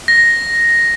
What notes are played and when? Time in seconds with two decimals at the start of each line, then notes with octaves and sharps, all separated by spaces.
0.08 A#6